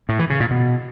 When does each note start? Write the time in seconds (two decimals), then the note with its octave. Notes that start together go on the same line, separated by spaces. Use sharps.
0.09 A2
0.19 E3
0.30 C#3
0.40 A#2
0.51 B2